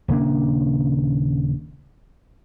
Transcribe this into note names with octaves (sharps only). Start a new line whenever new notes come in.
D#1 C#3 A#3 D4